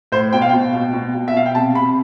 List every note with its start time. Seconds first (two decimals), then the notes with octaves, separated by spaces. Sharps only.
0.12 A2 C5
0.33 B2 G5
0.42 F5
0.49 B2 G5
0.74 B2
0.93 B2
1.15 B2
1.28 E5
1.34 B2 F5
1.46 G5
1.55 C3 A5
1.75 C3 B5